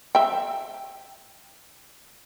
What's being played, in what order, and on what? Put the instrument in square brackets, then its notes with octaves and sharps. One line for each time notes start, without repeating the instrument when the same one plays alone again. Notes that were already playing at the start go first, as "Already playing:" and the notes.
[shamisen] E5 G5